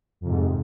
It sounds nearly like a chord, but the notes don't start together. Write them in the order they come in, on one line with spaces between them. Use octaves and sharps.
F2 C3 G#2